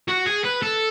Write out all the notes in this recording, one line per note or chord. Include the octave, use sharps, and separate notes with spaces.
F#4
G#4
B4
A4